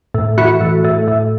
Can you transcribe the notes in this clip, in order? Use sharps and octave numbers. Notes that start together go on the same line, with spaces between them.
A2
E3 F#4
A2
A2
A2